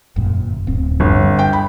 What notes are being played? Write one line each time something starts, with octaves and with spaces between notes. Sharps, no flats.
G1 F#2 A#2
D1 C4
G1
G2
G5
B5